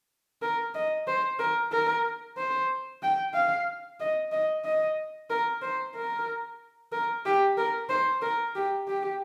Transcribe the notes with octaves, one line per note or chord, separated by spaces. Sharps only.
A#4
D#5
C5
A#4
A#4
C5
G5
F5
D#5
D#5
D#5
A#4
C5
A#4
A#4
G4
A#4
C5
A#4
G4
G4